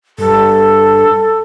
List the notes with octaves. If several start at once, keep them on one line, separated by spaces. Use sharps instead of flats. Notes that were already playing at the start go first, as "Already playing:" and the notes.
G2 A4